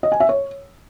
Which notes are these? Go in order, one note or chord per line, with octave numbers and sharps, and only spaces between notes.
D#5
G#5
E5
C#5